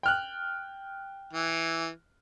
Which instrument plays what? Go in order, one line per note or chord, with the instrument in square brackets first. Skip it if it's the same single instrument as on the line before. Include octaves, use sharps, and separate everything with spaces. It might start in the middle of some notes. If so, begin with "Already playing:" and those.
[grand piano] G5 F6 F#6
[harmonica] E3